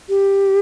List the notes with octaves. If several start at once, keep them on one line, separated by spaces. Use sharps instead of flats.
G4